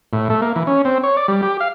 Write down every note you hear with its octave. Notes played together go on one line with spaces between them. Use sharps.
A2
A3
A#3
E3
C#4
C4
C#5
D5
G3
G4
F5